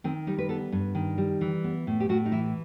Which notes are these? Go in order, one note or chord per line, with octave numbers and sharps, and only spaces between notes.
D#3 C4
G3 D#4
B4
B3 A4
G2
D#3
G3
E3
B3
A2
G4
A2 F#4
D#4
E3 E4